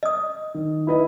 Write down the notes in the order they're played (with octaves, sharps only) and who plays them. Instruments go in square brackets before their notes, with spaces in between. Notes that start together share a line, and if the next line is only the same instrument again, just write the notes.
[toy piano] D#5 D#6
[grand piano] D#3
E4 B4 D#5